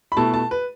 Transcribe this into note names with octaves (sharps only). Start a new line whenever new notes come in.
B5
B2 A3 E4 A5
A5
B4